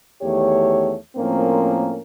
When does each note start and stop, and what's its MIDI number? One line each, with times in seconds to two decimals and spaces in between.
0.22 0.95 40
0.22 0.95 51
0.22 0.95 57
0.22 0.95 67
0.22 0.95 73
1.16 2.01 45
1.16 2.01 53
1.16 2.01 58
1.16 2.01 60
1.16 2.01 61
1.16 2.01 70